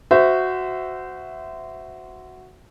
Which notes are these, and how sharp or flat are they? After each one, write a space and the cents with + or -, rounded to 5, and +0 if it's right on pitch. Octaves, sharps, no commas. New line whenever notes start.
F#4 +0 C5 -20 E5 +0